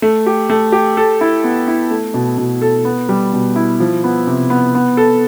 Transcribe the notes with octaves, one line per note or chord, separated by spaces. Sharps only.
A3
G4
A3
G4
A4
E4
B3
E4
A3
B2
B2
A4
B3
G3
B2
E4
F3
B3
C3
B3
B3
A4